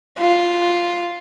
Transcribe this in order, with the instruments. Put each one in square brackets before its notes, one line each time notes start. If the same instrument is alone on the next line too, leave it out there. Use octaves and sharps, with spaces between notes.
[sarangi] F4